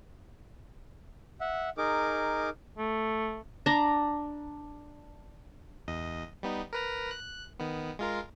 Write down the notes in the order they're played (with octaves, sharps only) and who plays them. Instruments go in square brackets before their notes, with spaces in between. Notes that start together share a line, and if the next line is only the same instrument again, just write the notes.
[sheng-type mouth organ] E5 F#5
D#4 G#4 A#4 D6
[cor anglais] A3
[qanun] D4 A#5
[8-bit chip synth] E2 D#5
G3 B3 D#4
A#4 B4 A#5
F#6
D#3 B3
G#3 F4 A#4